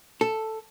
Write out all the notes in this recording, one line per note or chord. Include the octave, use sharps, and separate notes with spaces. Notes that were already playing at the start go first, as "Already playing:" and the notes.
A4